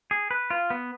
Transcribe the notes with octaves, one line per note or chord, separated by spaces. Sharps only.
G#4
B4
F4
B3